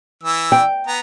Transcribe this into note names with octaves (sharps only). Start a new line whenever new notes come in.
E3 E6
G5
B3 A#5